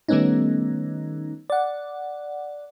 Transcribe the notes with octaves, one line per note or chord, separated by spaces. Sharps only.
D#3 G3 A3 B3 C#4 D#4
D5 F#5